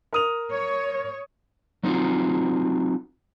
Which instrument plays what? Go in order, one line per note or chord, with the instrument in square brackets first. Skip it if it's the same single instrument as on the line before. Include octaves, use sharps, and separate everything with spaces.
[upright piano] A#4 D#6 F7
[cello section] C#5
[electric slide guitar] F#3 C4 D#4 F4 F#4